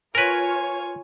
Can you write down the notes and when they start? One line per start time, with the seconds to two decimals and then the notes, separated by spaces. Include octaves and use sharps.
0.15 F4 A#4 B4 C#5 G#5